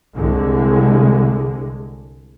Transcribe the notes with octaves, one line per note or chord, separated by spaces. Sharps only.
C2 D3 G#3